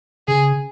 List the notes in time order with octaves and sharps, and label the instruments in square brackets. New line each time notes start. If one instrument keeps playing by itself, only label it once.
[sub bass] C#3 [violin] G#4